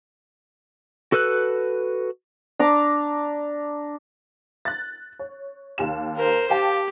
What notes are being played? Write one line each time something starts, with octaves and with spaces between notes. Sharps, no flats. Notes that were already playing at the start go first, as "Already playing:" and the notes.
F#4 A4 B4 E6 F#6
D4 A#5 D6
F#6 A6
C#5
D#2 G4 E7
A#4 C5
G4 F5 G5 A5